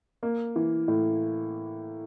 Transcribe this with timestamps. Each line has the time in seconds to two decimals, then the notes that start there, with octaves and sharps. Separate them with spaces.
0.23 A#3
0.56 E3
0.88 A2